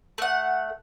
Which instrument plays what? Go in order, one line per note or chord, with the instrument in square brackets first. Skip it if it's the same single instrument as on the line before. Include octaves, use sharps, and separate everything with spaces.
[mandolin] A3 F#5